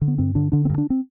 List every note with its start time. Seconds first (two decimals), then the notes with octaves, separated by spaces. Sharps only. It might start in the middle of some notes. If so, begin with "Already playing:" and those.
0.01 D3
0.08 B3
0.18 G2 C4
0.35 D3 D4
0.52 D3 D4
0.65 C4
0.70 G2
0.78 D4
0.90 C4